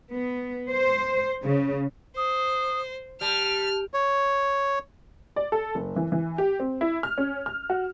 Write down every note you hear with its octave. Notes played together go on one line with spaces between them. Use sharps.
B3
C5
C#3
C5 D#6
G3 A5 F6
C#5
D5
A4
F#1
E3
E3
G4
C4
E4
F6
C#4
F6
F#4